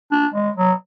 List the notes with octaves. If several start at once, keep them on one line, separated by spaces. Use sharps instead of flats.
D4
G#3
F#3